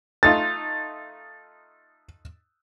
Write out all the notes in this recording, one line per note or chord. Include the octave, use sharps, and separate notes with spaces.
A3 D#4 F4 A6